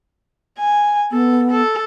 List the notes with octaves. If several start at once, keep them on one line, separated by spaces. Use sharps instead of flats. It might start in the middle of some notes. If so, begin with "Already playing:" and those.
G#5
B3 A4
A4